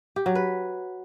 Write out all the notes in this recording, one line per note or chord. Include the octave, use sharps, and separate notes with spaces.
G4
F#3
B4